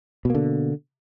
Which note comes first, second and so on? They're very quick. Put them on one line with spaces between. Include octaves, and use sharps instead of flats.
B2 A#3 D3